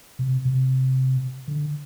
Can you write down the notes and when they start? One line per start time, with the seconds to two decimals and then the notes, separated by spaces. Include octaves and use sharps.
0.19 C3
0.45 C3
1.48 D3